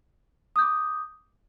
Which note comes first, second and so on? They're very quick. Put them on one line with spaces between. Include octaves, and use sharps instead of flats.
D#6 G6 D6